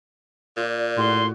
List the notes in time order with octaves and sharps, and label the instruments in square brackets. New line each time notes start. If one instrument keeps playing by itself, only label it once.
[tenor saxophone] A#2 [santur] F4 D5
[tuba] A2 [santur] F#4 G#4 [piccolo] C6